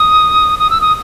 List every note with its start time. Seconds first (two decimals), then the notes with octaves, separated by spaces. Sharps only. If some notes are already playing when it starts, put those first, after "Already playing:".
Already playing: D#6
0.59 D#6
0.70 E6
0.81 D#6